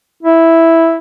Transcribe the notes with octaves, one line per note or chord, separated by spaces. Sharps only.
E4